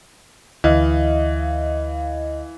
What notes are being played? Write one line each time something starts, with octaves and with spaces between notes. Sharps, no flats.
D2 E3 D#5 F5